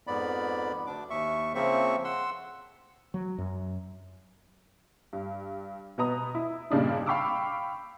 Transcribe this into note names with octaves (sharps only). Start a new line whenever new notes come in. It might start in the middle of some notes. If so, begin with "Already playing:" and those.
F2 G#2 B3 D5 B5
D2 D4 D6
D#2 E5 C#6
C#3 F3 A#3 C4 E5 C#6
F#5 C6 E6
F#3
F#2
G2
B2 B3 D#5 A#5 D#6
E4
G2 A#2 C#3 D4 D#4
F5 G5 B5 C#6 D6 E6